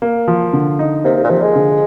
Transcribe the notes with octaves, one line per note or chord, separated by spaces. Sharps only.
A#3
F3
D3
D#4
C3 A#3
C3
A#2
C3 F3
G#3
D3